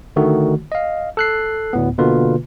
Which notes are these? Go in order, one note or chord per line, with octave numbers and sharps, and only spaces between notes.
D3 D#3 A3 F#4
D#5 F5
A4 F#6 C7
D2 A2 B3
B2 D3 A#3 F4 B4